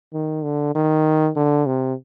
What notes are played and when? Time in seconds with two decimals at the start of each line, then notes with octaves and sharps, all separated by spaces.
0.13 D#3
0.44 D3
0.75 D#3
1.36 D3
1.66 C3